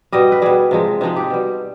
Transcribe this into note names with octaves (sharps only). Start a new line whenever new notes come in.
B2 G3 D#5
B4
B2 G3 G#4
C3 F3 G#3
C3 F3 G#3 D#4
G4
B2 G3